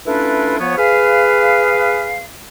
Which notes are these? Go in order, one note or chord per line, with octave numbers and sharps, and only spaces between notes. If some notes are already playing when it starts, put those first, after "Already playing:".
A3 C#4 D4 E4 F4 B4
F3 B3 C#5
G#4 B4 F5